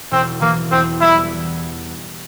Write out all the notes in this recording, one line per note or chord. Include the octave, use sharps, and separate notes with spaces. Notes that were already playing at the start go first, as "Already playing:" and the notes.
E1 C4
E3 A#3
E2 C4
G3 E4